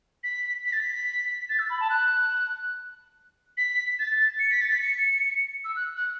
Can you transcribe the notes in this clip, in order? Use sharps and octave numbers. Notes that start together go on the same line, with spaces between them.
B6
B6
A6
B6
A6
E6
B5
A5
F#6
B6
A6
C#7
B6
A6
B6
C#7
E6
F#6
F#6